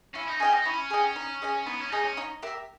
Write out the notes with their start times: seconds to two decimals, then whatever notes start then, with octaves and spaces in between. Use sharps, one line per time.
0.15 C#4 E4
0.28 D#4
0.40 C#4 G#4 D#5 G5
0.52 D#4
0.65 C#4 E4
0.90 G#4 D#5 G5
1.16 D#4
1.42 G#4 D#5 G#5
1.66 B3 D#4
1.80 C#4
1.91 D#4 G#4 D#5 G#5
2.04 C#4
2.17 D#4
2.43 G4 A#4 E5